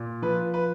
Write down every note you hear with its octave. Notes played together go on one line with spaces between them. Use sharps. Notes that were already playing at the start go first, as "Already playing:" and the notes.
Already playing: A#2
F3 B4
B4